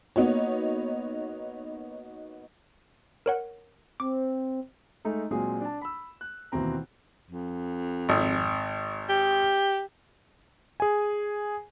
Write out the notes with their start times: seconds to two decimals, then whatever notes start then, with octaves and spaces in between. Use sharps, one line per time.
0.16 A#3 B3 D#4 F#4 C#5
3.26 A#4 C#5 F#5
4.00 C4 D6
5.05 G#3 A3 D#4 A4
5.31 A#2 F#3 G#3 C4 F4 G#4
5.61 D4 A5
5.81 B5 E6
6.21 F#6
6.52 D#2 B2 E3 C4 A#5
7.31 F2
8.09 G#1
9.09 G4
10.80 G#4 G#5